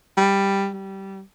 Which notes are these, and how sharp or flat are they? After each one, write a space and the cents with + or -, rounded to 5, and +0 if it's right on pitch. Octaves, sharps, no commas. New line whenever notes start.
G3 +5
G3 -15